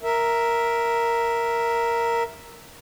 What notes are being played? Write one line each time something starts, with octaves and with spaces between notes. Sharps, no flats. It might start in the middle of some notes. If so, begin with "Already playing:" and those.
A#4 E5